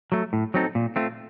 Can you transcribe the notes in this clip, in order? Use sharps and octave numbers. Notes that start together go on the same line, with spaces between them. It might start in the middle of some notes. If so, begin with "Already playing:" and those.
F#3 A3
A2
F#3 C4 D#4 A4
A#2
A3 C4 F4